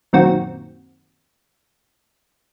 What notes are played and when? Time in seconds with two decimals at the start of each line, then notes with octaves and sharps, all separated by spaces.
0.13 F#2 A#2 D#3 C4 F#4